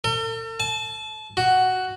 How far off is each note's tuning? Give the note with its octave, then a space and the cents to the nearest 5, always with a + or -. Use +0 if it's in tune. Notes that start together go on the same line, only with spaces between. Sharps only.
A4 +45
A5 -30
F#4 +5